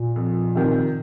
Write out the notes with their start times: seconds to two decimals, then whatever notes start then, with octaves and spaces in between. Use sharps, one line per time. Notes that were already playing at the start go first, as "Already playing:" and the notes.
Already playing: A#2
0.16 F2
0.55 C3 D#3